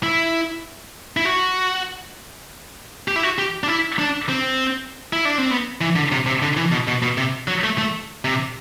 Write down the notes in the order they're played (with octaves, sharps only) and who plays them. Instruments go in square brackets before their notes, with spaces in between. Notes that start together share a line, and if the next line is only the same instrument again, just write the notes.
[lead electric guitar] E4
E4
F#4
G4
E4
F#4
G4
D4
E4
D4
C4
E4
D4
C4
B3
E3
D3
C3
C3
D3
E3
B2
B2
B2
C3
F#3
A3
A3
C3